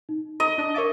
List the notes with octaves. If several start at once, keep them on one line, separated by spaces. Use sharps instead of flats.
D#4
D#5 A#5
D4
A#4 C#5 E5 D6 A6